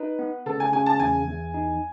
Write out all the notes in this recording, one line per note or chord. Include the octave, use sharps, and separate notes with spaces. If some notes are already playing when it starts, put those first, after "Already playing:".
Already playing: D#4 B4
B3
C#3 A4
G#5
C#3 G#5
A5
E2 G#5
E2
D#4